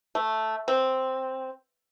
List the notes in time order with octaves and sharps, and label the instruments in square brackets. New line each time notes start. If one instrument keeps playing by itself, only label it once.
[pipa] A3
C4